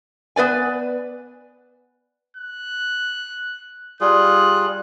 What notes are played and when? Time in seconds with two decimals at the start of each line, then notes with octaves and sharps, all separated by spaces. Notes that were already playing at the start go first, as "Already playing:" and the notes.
0.36 B3 B4 D5 G#5
2.37 F#6
4.01 G3 F4 G#4 F#6